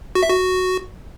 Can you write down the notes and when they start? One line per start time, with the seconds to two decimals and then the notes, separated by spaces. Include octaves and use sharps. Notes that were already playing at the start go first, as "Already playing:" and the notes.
0.15 F#4
0.23 E5
0.30 F#4